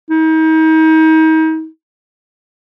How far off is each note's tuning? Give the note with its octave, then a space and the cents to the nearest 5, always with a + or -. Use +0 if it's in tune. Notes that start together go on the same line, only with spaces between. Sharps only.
D#4 +35